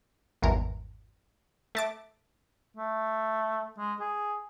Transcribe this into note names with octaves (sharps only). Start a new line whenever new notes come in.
G#1 E2 G2 A#4
A3 A5 D6
A3
G#3
G#4